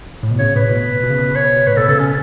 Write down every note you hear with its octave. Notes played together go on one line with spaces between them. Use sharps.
A2
B2
C#3 C#5
A2 B4
B2
B2
C#3
B2
B2 C#5
A2 B4
B2 A4
C#3 A4
B2 C#4